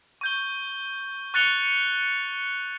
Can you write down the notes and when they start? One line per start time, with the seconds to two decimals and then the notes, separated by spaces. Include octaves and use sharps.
0.21 C#6 G6 G7
1.34 C#6 F#6 A6 C#7 F7 G7